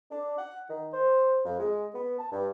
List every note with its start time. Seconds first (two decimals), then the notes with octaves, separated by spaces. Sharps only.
0.11 D4
0.38 F#5
0.69 D#3
0.93 C5
1.44 F2
1.58 G#3
1.94 B3
2.18 A5
2.30 G2